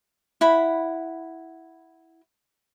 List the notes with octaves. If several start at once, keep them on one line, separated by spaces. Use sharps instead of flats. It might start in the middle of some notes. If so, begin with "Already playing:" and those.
E4 F#5 B5